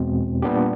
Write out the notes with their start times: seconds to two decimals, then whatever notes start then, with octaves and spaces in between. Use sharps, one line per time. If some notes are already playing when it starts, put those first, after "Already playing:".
Already playing: E2 B2 G#3 C4
0.42 A#2 G3 B3 D4 G4